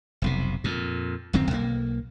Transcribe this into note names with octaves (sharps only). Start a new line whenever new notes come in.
F1 B1 C3
F2 A#2
D1 F#2 D#3 C4
B1 A#3